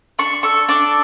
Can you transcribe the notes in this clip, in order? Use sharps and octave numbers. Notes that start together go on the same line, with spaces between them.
D4 C#6
A4 C#6
D4 D6